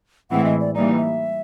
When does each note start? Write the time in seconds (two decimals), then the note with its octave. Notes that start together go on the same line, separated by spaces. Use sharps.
0.31 A2 E3 G#3 C4 E4 F#5
0.45 D#5
0.60 D5
0.75 E3 G3 A#3 D#4 D5
0.98 E5